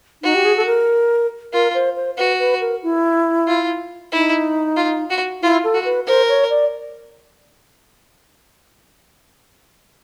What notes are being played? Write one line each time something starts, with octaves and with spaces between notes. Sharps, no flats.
D#4 F#4
G4
G#4
A4
A#4
F4 A#4
C5
C5
F#4 B4
B4
A#4
E4
F4
D#4 E4
F4
F#4
E4 F4
A4
F#4
B4
A#4 C5
C#5
D5